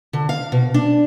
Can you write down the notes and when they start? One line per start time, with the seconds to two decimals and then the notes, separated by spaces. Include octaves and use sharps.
0.13 D3
0.29 F5
0.52 B2
0.74 D4